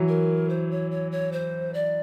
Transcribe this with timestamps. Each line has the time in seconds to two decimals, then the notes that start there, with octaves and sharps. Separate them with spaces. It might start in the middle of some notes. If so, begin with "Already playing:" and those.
Already playing: E3 F#3
0.08 A#4
0.49 C5
0.71 C#5
0.91 C#5
1.12 C#5
1.32 C5
1.74 D5